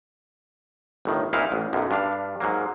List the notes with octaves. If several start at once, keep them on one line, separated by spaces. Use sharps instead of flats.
G1 A2 D#3
C2 A#2 D#4 E4 F5
A1
B1 F#2
G2 D4 F5
G#2 F#3 A#3